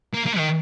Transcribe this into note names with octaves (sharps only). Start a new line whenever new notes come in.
A#3
A#3
D#3